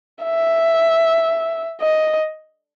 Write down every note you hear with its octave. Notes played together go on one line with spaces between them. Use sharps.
E5
D#5